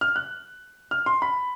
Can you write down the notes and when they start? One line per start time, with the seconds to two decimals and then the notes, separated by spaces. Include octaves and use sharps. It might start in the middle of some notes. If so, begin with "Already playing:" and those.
0.01 F6
0.16 F#6
0.91 F6
1.06 C6
1.22 B5